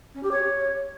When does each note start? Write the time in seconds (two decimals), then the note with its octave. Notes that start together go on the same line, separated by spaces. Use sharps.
0.15 C#4
0.23 G4
0.31 C#5